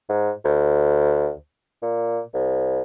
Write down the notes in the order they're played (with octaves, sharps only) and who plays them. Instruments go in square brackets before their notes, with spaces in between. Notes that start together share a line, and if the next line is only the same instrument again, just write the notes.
[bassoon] G#2
D2
A#2
C2